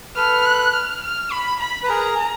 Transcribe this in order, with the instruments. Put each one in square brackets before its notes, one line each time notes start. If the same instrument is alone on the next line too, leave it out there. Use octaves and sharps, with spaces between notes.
[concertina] A4 B4 [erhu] F6
[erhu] F#6
F6
F6
B5
B5
[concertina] B4
[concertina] G#4 A#4 [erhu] A#5